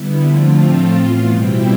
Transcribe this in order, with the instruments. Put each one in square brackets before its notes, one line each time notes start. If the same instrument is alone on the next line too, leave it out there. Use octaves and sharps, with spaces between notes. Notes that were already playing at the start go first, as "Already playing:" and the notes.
Already playing: [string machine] D3 G3 B3 E4
D3 F3 A3 C4 F4
A2 F3 A3 C4 F4 A4
A2 E3 B3 F4
B2 G3 C4 E4 G4